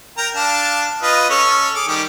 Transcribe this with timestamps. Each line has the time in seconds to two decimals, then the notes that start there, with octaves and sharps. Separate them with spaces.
0.17 A#4 G5 A#5
0.35 D4 F5 A5
1.02 F4 B4 D#5
1.30 C#4 A4 C#5
1.76 G#4 D6
1.88 D#3 G3 G4